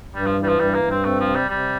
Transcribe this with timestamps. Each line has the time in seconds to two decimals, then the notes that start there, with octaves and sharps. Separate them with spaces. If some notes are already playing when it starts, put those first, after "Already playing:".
0.14 G2 G3
0.26 F3
0.38 E3
0.43 G3
0.48 F3
0.59 G2 G3
0.75 A#3
0.82 G2
0.90 C4
1.04 A3 C4
1.20 F3
1.28 C3
1.35 G3
1.50 C3 G3